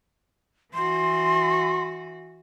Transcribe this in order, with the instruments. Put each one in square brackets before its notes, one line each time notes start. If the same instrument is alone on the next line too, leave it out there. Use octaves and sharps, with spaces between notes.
[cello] E3 F#4 [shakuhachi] C6